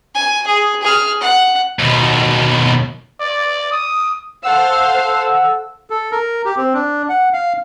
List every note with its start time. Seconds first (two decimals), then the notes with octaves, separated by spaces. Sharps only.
0.14 G#5
0.47 G#4
0.82 G#4 F6
1.21 F#5
1.79 D#2 B2
3.20 D5
3.72 D#6
4.42 A4 C5 F5 F#5 E6
5.90 A4
6.12 A#4
6.45 G4
6.57 C4
6.73 D4
7.09 F#5
7.33 F5